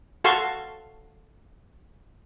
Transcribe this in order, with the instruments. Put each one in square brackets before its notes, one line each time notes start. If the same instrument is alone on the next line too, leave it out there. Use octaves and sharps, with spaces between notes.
[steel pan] F#4 A4 F5 A5 C6 C#6